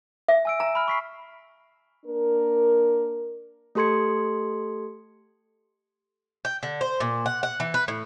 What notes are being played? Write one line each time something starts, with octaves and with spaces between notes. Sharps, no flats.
E5
G#5 E6 D7
A#5
B5 F6
C#6 B6 C7
A#3 D4 A#4
A3 G4 A4 C6 G#6 C#7
G5
D3
C5
A#2
F#5
F#5
E3
B4
A2